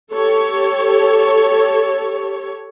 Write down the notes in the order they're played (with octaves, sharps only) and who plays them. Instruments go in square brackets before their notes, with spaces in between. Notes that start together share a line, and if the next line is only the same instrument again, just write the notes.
[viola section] G4 A4 C#5